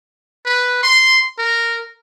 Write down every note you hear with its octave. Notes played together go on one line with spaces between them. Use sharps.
B4
C6
A#4